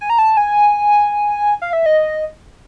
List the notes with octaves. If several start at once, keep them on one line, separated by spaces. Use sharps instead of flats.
G#5
A#5
A5
G#5
F5
E5
D#5